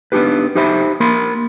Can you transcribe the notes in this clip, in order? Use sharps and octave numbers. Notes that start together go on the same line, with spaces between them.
B3 D4 D#4 G4 B4
D#4 G4 C5 E5 B5
A#3 A#4 B5 C6